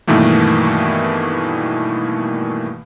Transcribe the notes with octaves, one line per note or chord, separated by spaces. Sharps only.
G2 B2 D#3 E3 A3 A#3